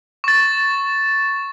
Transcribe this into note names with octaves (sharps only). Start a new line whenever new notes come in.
C#6 A6